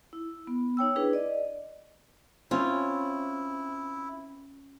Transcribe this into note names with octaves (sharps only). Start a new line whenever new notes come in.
E4
B3
D#4 C#5 G5 E6
D4 E4 G#4 B4
D5 D#5
C4 C#4 E4 F4